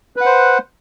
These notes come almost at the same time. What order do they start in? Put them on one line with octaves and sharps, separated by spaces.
B4 F#5 C5